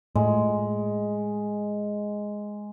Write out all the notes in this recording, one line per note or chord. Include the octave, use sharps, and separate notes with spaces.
A2 G#3